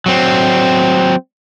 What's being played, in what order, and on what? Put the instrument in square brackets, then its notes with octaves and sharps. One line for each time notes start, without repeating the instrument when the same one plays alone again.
[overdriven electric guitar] F#3 C4